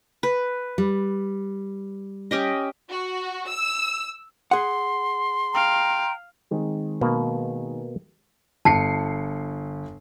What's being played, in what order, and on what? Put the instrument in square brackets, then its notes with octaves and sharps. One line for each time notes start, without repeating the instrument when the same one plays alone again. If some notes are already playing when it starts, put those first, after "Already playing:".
[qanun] B4
[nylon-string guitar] G3
[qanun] C#4 G4 D#5
[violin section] F#4
E6
[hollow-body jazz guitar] G#4 F#5 [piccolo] C6
[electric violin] F5 [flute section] G5 A#5
[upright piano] D#3 G#3 C4
[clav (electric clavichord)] B2 A#3
[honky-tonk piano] G1 C7 C#7 [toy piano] A5